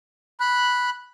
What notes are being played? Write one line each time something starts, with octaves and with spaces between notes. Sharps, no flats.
B5 F#6